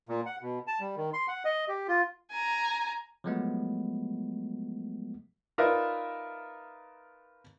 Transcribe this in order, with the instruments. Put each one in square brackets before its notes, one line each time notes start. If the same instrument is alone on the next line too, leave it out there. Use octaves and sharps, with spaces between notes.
[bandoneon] A#2
F#5
B2
A5
G3
D#3
C6
F#5
D#5
G4
F4
[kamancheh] G#5 A#5
[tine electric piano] F3 F#3 G#3 A3 B3
[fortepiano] D#4 F4 A#4 B4 D5 E5